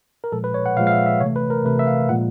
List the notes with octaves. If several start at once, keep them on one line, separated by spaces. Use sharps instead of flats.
A#4
A#2 F3 G#3 A4
B4
C#5
F#5
A#2 F3 G#3 F5
F5
E5
E5
C3 E3 A3 C#5
B4
A#4
C3 E3 A3 B4
E5
F5
A#2 F3 G#3 F#5